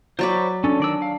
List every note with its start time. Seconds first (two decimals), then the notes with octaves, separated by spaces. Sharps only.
0.19 F#3 C5 D5 B5 C#6 D6
0.64 C#4 D4 A4
0.80 D#3 D5 E6
1.02 F5